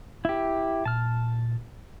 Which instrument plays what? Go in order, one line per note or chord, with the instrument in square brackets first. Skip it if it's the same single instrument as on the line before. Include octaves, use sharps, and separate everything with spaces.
[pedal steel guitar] E4 G4
[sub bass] A#2 [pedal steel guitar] A5 F6